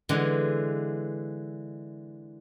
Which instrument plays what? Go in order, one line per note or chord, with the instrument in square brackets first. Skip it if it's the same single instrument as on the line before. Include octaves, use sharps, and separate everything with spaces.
[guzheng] D3 E3 G#3